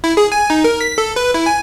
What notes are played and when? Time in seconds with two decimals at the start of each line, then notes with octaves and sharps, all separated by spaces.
0.04 E4
0.17 G#4
0.32 G#5
0.50 D#4
0.64 A#4
0.81 B6
0.98 A4
1.16 B4
1.34 E4
1.46 G#5